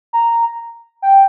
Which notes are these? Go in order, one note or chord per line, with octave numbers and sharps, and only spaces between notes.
A#5
G5